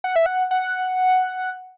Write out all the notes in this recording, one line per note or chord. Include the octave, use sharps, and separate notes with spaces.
F#5
E5
F#5
F#5